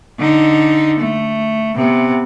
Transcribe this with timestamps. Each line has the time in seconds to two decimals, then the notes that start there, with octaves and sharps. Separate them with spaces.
0.19 D3 D#4
0.99 A3
1.76 C3 B3